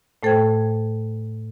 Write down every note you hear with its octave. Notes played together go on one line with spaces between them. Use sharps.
A2 A3 A4 C5 G5 G#6